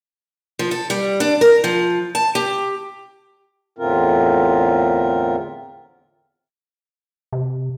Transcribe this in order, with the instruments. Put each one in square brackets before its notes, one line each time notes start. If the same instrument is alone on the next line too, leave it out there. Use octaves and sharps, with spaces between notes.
[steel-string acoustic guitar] F3
A4
G3
D4
A#4
F3
A5
G4
[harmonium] E2 A2 D3 C4 F4 A#4
[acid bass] C3